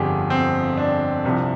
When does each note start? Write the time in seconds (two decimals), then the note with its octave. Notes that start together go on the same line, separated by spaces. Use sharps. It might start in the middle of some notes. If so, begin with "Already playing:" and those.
Already playing: G1 F2 D3 F3 G4 G#4
0.30 C4
0.77 D4
1.25 C2 C3 F3